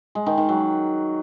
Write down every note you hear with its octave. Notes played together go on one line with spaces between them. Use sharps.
G#3
D#3
D#3
F#3